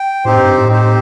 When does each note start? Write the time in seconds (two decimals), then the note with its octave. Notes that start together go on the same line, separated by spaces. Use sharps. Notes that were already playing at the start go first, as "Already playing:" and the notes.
Already playing: G5
0.25 A2 C4 D#4 G4 C5
0.36 G2
0.46 G2
0.57 A2
0.68 C4 D#4 G4 C5